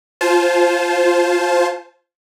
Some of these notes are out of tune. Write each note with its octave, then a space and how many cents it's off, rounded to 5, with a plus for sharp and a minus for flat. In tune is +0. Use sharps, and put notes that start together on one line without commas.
F4 +0 C5 +0 A5 -30